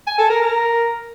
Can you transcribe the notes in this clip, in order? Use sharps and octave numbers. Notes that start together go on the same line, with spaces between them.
G#5
A4
A#4
A#4